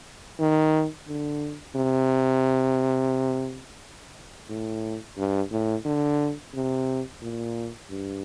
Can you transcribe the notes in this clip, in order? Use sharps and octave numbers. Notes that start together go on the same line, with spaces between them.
D#3
D3
C3
A2
G2
A2
D3
C3
A#2
G2